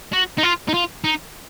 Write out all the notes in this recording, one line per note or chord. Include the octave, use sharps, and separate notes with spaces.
F#4
D#4
F4
D#4
F4
D#4